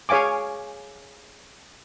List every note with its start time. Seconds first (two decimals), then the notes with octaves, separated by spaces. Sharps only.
0.09 G#4 C#5 F5 G#5 D6